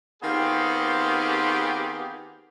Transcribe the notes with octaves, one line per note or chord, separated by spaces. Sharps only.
D#3 B3 C4 F4 G4 G#4